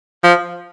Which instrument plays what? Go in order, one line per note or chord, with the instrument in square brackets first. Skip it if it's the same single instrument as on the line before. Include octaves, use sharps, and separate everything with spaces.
[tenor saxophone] F3